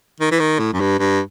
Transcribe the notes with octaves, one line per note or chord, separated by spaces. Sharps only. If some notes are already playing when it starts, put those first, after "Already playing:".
D#3
E3
D#3
A2
F#2
G2
G2